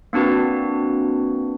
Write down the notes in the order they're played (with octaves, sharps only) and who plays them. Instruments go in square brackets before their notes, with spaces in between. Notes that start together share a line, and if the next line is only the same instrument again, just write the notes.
[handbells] A#3 C4 D4 F#4 B4